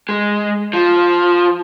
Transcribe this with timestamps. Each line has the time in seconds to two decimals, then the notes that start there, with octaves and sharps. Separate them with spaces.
0.09 G#3
0.73 F3